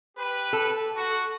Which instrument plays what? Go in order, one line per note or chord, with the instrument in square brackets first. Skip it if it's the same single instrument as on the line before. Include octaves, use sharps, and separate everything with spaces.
[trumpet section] G4 B4
[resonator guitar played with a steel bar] A4
[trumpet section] F#4